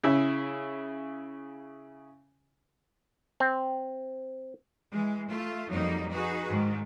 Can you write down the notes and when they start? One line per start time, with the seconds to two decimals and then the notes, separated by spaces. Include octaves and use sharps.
0.04 C#3 E4
3.40 C4
4.91 E3 G#3
5.28 A3 F4
5.69 F2 F#3 G3 A#3 D#4
6.11 D#4 F#4 G#4 B4
6.48 G#2 D#3